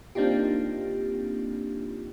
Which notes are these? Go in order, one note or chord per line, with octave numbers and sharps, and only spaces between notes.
A#3 C4 D4 D#4 F4 G4